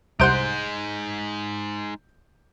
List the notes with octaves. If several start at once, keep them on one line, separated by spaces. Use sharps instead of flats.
C2 G#3 D#4 C5 F#5 G6 D7